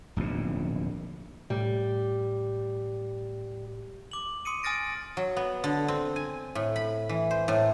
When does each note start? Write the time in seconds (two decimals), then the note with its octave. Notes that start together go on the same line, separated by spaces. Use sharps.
0.16 D1 A#1 D#2 B2
1.50 A2 G3
4.11 D6 F#7
4.45 C6 D#6 C#7 D#7
4.63 G#5 D#6 F6 A6 A#6 D7
5.17 F#3
5.37 B3
5.64 D3
5.88 C4
6.16 G#5
6.55 A2
6.76 B5
7.09 E3
7.31 C5
7.48 A2